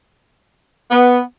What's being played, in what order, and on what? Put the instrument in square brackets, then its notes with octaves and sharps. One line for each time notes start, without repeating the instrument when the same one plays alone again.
[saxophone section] B3